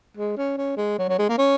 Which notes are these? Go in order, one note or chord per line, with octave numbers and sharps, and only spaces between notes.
G#3
C#4
C#4
G#3
F#3
F#3
G#3
A#3
C#4